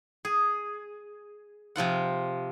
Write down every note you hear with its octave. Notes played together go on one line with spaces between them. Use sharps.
G#4
C3 F3 F4 F#5